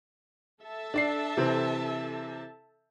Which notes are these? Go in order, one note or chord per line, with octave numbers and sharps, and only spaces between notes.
A4 E5 A5
D4 D5 C7
C3 E3 C4